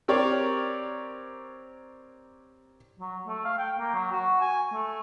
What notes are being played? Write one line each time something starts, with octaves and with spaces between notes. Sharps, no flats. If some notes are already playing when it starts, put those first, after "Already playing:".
C4 G4 A#4 C#5 D5
F#3
A3
F5
G5
A#3
F#3
F#4
G#5
A3